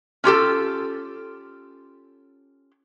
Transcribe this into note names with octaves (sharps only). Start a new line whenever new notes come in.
C#4 F4 G4 A4